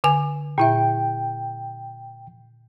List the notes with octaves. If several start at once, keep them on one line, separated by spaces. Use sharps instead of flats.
D3 G#5
A#2 E4 E5 G5